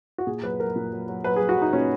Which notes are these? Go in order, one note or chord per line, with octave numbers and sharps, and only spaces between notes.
F#4
A#2 G#4
F#3 B4
F#3 A#4
A#2
F#3
F#3
F#3 B4
F#3 G#4
F#4
F#3 D#4
A#2 C#4